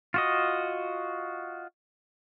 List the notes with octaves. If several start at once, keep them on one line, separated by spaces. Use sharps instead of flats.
F4 F#4 D#5